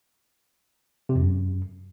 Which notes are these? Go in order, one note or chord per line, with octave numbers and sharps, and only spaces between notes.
C3
F2
F#2